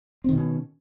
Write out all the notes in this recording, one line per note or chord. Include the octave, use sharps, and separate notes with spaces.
B2 D#3 C4 C#4